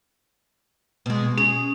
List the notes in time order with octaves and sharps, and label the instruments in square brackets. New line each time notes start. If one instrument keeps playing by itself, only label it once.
[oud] B2 G#3
[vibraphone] C#4 [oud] G#4